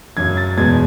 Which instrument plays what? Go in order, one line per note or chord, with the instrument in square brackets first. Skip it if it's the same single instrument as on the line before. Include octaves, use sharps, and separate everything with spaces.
[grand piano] F#2 C#3 F#3 G#6
A6
E2 B2 G#3 G#6